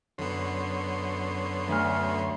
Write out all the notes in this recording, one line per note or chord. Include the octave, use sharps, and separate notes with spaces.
F#2 D3 B3 C#5 C6
D2 G#5 F6